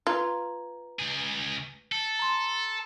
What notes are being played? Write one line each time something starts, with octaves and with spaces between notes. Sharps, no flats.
F4 B4 A#5 G#6
C#2 G#4
A4
A#5 C6